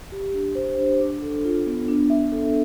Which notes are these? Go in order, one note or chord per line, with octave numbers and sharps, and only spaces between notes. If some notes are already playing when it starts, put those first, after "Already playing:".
G4
D4
C5
D4
D4
A4
F4
B3
D4
E5
A4